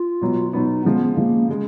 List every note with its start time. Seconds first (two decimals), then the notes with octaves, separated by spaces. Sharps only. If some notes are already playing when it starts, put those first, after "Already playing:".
Already playing: F4
0.21 B2 F#3 B3
0.53 B2 F#3 B3 D#4
0.84 C#3 F3 G#3 B3
1.16 C#3 F3 G#3 A#3
1.48 C#3 G#3